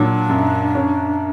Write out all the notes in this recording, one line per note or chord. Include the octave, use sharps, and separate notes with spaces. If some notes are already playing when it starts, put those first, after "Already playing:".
Already playing: A#2 F#3 D4
F#2
C#4